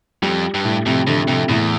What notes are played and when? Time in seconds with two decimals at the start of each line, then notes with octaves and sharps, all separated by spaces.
0.22 F2 G3
0.54 G2
0.65 A2
0.86 F2 C3
1.07 F2 D3
1.28 F2 C3
1.49 E2 A2